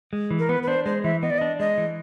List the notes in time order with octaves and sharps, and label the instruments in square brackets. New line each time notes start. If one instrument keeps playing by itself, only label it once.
[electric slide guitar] G#3
E3
[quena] A#4
[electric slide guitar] B3 [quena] B4
[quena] B4
[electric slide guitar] D4 [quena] C5
[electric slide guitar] G#3 [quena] C5
[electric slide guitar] E3 [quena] E5
[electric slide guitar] B3 [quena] D#5
[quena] D5
[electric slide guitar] D4 [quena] D#5
[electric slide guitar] G#3 [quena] D#5
[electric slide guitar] E3